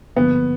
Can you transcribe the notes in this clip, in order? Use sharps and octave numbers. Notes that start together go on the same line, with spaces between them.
G#1 G2 D3 F3 A#3 B3